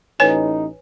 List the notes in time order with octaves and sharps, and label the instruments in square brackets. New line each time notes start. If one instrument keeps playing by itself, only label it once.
[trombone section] A1 D#4 [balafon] B4 C#5 G#5